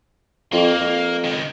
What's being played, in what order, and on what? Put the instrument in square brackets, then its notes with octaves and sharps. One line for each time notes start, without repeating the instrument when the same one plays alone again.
[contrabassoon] F2 [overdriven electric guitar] A#3
[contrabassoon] F2
[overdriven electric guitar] C#2 D#3